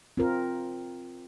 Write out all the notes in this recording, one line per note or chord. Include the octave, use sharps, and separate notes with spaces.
C4 F4 A#4